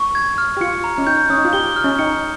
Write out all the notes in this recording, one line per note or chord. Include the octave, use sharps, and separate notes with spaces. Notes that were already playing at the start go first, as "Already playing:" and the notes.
Already playing: C#6
G#6
F6
G4
F4 C#7
A#5
C#4
D#4 G6
C#4 D#6
D#4
F4
G4 G7
F6
C#4
D#4 C#7